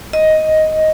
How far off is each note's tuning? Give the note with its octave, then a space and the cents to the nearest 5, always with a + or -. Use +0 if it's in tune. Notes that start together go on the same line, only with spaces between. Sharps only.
D#5 +5